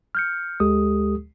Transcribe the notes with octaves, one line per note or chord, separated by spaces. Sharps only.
F6 G6 C#7
D2 G#3 G4 A4 D#6